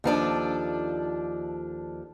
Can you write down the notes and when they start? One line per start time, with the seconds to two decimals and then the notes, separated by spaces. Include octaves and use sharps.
0.04 D#2 F3 D4 A4